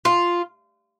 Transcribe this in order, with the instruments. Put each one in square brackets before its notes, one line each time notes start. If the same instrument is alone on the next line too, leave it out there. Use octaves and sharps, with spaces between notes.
[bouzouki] F4